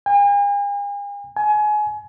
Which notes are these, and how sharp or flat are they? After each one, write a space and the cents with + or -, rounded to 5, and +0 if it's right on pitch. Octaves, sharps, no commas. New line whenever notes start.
G#5 -45
G#5 +25